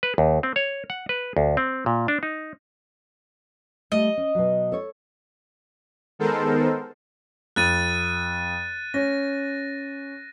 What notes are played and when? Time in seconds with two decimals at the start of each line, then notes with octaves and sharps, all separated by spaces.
0.03 B4
0.18 D#2
0.43 C4
0.56 C#5
0.90 F#5
1.09 B4
1.37 D2
1.57 C4
1.86 A#2
2.08 D4
2.23 D#4
3.92 G3 A3 D#5
4.17 C#4
4.35 B2 F#3
4.72 A4 C#5
6.19 D#3 G#3 B3 A4 A#4 C5
7.56 F2 F#6 A6 D#7
8.94 C#4 A#6